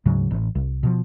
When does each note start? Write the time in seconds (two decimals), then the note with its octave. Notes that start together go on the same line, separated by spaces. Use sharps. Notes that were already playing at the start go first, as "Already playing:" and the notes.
0.05 D2 G#2 C#3 F#3
0.31 A1
0.55 C2
0.83 B2 D#3 F3